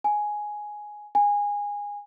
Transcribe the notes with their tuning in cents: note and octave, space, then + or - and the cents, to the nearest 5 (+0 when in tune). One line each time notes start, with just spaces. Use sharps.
G#5 +5
G#5 -20